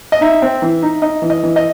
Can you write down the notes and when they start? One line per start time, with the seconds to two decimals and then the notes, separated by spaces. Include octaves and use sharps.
0.12 D#5
0.21 D#4 E5
0.42 C4
0.62 E3
0.83 D#4
1.02 D#4 D#5
1.22 E3
1.30 D#5
1.43 E3
1.56 D#5